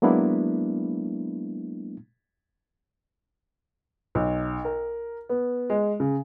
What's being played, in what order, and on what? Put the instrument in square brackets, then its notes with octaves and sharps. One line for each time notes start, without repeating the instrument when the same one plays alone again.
[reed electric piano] F#3 G#3 A#3 B3 D4 E4
[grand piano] B1
A#4
B3
G#3
C#3